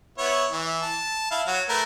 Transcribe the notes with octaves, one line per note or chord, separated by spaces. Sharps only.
B3 E4 C#5
E3
A5
E4 F5
F#3 F#4
A3 A#4 B4